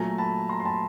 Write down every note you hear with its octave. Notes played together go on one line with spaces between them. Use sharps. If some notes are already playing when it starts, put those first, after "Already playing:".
Already playing: A#2 F#3 A3 G#5 A#5
A5 B5
A#5 C6
C6
A5 B5